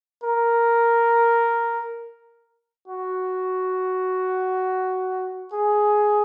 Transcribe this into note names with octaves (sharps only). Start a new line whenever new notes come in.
A#4
F#4
G#4